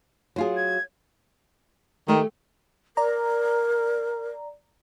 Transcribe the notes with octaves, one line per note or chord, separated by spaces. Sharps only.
F#3 F4 G#4
G#6
D#3 A3 G4 G#4
A#4 D5 A#5